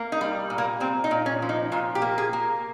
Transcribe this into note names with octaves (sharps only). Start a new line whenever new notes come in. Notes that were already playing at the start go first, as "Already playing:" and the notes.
Already playing: A#3
D#4
G3
A#2
A#3
A#2 C4
D#4
A#2
C#4
F3
D#4
A#2 F4
G4
A#3
G#4
A#3